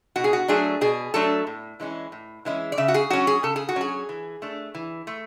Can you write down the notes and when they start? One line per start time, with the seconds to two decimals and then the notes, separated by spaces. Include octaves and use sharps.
0.16 B2 F#4
0.24 G#4
0.33 F#4
0.48 F#3 A3 D4 G#4
0.81 B2 G#4
1.14 F#3 A3 D4 A4
1.47 A2
1.80 E3 G#3 C#4 E4
2.12 A2
2.45 E3 G#3 C#4 E4
2.72 D5
2.78 C#3 E5
2.88 F#4
2.94 G#4
3.10 F#3 C#4 F#4
3.27 G#4
3.43 C#3 A4
3.56 G#4
3.69 F#4
3.76 F#3 C#4 G#4
4.09 E3
4.42 A3 D4
4.75 E3
5.07 A3